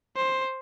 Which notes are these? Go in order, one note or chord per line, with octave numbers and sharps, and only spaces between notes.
C5